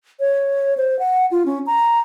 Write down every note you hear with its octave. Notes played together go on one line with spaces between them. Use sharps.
C#5
C5
F#5
F4
C#4
A#5